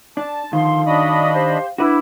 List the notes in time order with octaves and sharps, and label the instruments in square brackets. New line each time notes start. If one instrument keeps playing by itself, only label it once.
[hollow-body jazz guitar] D4 [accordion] A5
[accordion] D3 F3 [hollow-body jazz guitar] D#3 [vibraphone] F5 [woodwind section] C6
[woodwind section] F#2 C#6 D#6 [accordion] D4 D#5 B5
[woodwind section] G4 C5
[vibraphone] D4 D6 [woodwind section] E4 [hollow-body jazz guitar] F#4 B4